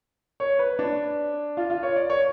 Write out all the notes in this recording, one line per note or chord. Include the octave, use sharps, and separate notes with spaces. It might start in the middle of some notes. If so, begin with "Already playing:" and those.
C#5
B4
D4
F4
F4
C#5
D5
C#5